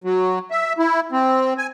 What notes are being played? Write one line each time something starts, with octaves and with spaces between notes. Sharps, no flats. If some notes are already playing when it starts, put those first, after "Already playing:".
F#3
E5
E4
C4
G#5